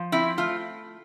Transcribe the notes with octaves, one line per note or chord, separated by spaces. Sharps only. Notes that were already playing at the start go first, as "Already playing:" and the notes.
Already playing: F3
C4 E4
A3 F4